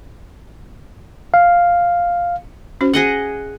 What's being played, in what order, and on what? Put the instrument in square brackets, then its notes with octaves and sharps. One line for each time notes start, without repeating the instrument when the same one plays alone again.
[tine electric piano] F5
[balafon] C#4 F#4 C5
[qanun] G#4 D#5 F#5